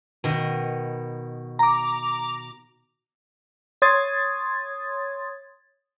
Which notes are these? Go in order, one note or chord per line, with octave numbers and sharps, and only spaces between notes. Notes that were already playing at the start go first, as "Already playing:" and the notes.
B2 D#3
A#5 D6
C#5 C6 D#6 G#6 A6